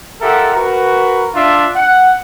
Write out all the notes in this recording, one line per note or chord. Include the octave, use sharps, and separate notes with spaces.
F4 G4 A4 A#4 E5 F#5
F#4 A#4 B4
D4 F4 E5
F#5